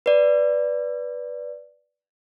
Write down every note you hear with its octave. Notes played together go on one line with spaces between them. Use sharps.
B4 D5